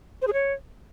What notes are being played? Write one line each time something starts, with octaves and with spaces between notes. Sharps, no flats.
C5
G#4
C#5